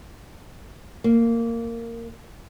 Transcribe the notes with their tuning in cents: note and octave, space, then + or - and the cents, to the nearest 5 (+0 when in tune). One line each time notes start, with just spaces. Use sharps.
A#3 -15